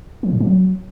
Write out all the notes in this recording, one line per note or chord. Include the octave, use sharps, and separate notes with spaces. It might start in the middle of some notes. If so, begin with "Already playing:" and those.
F3
A2
F#3